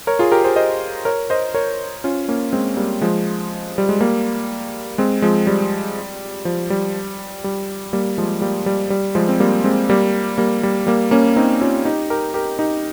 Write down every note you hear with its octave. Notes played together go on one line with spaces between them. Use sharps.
A#4 C#5
F4 G#4
G4 A#4
G#4 C5
C5 D#5
A#4 C#5
C5 D#5
A#4 C#5
C#4 F4
A#3 C#4
G#3 C4
G3 A#3
F3 G#3
G3
G#3
G3 A#3
G#3 C4
F3 G#3
G3
F3
G3
G3
G3 A#3
F3 G#3
G3 A#3
G3
G3
F3 G#3
C4
G3 A#3
G#3 C4
G3 A#3
G3 A#3
G3
G3 A#3
A#3 C#4
C4 D#4
C#4 F4
D#4 G4
G4 A#4
G4 A#4
D#4 G4